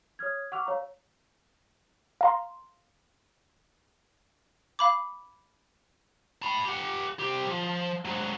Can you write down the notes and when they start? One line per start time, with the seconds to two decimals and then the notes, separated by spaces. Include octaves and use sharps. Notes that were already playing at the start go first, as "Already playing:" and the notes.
0.19 C#5 D#6 F6 G#6
0.52 F#5 C#6 D6 E6 F6 F7
0.66 C#5 F5 A#5
2.21 F5 A#5 C6
4.79 F5 B5 D6
6.42 A5 B5
6.65 G4 F#5
7.20 C2 G4
7.47 F3
8.05 G#2 F#3